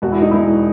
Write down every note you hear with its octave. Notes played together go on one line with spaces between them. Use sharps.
E1 F#4
E4
D#4
E1 E4